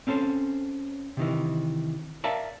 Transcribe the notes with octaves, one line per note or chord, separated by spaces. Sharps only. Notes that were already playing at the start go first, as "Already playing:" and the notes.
C4 C#4 A4 C5
C3 D#3 E3
A#4 D5 E5 F5 A5 A#5